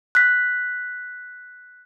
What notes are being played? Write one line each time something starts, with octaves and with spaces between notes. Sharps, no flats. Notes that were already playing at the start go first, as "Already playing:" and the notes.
F#6 B6